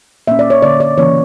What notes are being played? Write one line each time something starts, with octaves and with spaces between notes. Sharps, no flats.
A#2 A#3 C#4 E5
D5
C#5
D3 A#3 C#4 D5
D5
C#3 E3 A#3 C#4 C#5